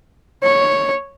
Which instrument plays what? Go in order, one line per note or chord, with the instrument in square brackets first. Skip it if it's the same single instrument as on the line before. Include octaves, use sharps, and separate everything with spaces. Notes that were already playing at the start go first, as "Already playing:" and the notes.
[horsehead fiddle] C#5